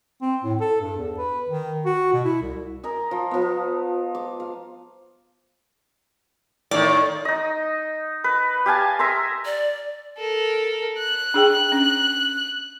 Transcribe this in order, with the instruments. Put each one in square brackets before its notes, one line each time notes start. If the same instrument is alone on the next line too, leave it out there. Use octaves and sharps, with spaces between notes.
[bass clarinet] C4
A2
A4
G2
E2
B4
D#3
F#4
B2
E4
C2
[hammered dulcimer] A#4 D#5 G#5
F3
F3 B3
D6
F5
[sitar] A2 D#3 [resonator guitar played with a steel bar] D5
[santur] D#4 D#5
B4
G4 F5 G#5 A5
E5 A#5 C6 D#6
[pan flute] D5
[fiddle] A4 A#4
F#6
[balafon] D4 G#4 G5
C#4